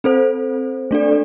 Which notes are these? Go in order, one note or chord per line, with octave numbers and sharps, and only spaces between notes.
C4 A4 C5
A3 D4 A4 D5